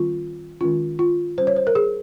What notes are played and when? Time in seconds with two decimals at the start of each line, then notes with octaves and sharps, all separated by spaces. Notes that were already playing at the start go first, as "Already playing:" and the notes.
Already playing: D#3 G3 C4 F4
0.61 D#3 G#3 C#4 F4
0.99 F4
1.38 G3 C#4 C5
1.47 C#5
1.56 C5
1.67 A#4
1.75 G#4